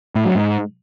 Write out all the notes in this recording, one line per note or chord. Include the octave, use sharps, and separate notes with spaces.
A2
F#3
G#2